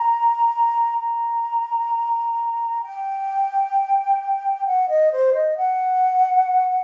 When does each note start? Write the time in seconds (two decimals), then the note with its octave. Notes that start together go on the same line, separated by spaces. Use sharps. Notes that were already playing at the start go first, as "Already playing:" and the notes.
Already playing: A#5
0.98 A#5
2.83 G5
4.66 F#5
4.89 D#5
5.12 C5
5.34 D#5
5.57 F#5